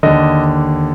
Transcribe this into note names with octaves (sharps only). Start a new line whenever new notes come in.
D#2 D3 D#5